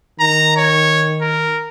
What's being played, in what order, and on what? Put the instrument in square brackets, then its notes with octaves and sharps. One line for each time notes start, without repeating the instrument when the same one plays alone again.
[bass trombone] D#3 [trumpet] A#5
[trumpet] C#5
A#4